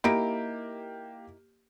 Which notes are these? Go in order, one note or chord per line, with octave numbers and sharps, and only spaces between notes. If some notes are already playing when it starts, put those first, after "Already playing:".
A#3 D#4 E4 G4 D7